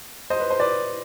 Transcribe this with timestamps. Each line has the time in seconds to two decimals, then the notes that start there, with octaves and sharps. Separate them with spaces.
0.30 C5 D#5
0.40 B4
0.50 C5
0.60 B4 D5